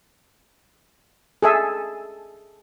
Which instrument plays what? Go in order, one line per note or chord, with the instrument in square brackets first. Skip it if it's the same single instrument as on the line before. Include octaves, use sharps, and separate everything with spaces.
[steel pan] G#4 A4 E5